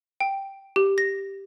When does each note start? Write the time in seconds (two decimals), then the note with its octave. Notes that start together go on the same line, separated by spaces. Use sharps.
0.20 G5
0.76 G4
0.98 A#6